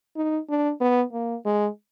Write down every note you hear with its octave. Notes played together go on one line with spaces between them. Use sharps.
D#4
D4
B3
A#3
G#3